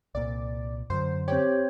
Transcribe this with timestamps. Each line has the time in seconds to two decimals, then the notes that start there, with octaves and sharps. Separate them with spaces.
0.15 C2 A#2 D5
0.90 F#2 D3 F#3 C5
1.28 C4 G4 C5 C#5